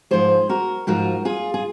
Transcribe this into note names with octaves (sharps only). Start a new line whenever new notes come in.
G#2 F3 G#4 C5
F#4 A#4
G#2 F3 F#4 A#4
F4 G#4
G#4